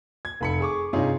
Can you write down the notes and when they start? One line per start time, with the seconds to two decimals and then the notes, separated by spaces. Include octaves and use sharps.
0.25 G#6
0.41 F1 B5 C#7
0.60 G#4 C#6 D6
0.93 G2 C3 D#4 F4 G#4 C#5